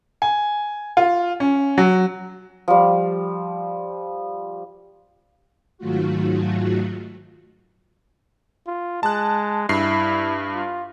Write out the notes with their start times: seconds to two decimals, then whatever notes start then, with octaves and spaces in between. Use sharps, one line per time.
0.22 G#5
0.97 F4
1.40 C#4
1.78 F#3
2.68 F3 G3
5.78 G#2 D#3 F#3 A3 F4 F#4
8.67 F4
9.03 G#3 A5 F#6
9.69 G2 E4 C7
10.54 F4